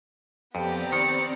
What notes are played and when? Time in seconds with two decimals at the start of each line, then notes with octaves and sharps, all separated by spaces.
0.55 F2 B3 C4 G4 D5 A#5
0.92 D#3 C#7